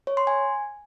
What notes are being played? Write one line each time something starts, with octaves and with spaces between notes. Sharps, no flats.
C#5
C6
G#5